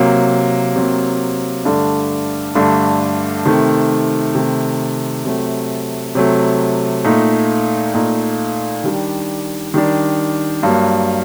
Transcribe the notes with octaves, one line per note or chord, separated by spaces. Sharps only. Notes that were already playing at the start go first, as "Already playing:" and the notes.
Already playing: C3 F#3 A#3
C3 F#3 A#3
G2 D3 A3 D4
G2 D3 A3 D4
C3 D#3 A3
C3 D#3 A3
C3 F#3 A3
C3 F#3 A3
A#2 A3 D#4
A#2 A3 D#4
D#3 G3 D4
D#3 G3 D4
G2 F#3 A#3